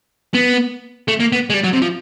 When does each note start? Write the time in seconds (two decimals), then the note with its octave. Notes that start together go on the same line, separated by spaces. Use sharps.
0.34 B3
1.08 A3
1.20 A#3
1.33 B3
1.50 G#3
1.54 G3
1.64 F#3
1.73 C3
1.82 F3